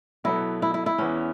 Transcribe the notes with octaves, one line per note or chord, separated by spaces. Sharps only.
B2 F#3 B3 E4 A4
E4
E4
E4
E2 E3 B3 C#4